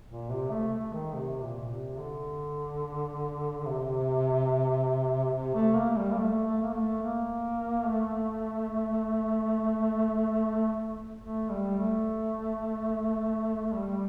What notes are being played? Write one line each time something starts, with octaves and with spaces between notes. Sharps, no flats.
A#2
C3
A3
A3
D#3
C3
A#2
C3
D3
C3
C3
A3
A#3
G3
A#3
A3
A3
A#3
A3
A#3
A3
A3
G3
A3
G3